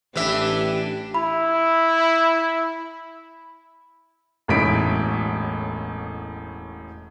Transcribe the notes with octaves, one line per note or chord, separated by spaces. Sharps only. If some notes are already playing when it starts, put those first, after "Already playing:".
A1 E3 D4 G4 E5
E4 B5
E1 A1 A2 D#4 B6 D7